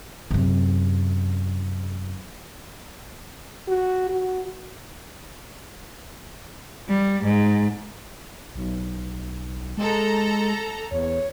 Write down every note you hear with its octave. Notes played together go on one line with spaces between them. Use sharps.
F#2 C3
F#4
F#4
G3
G#2
B1
G#3 A4 A#5
E2 C#5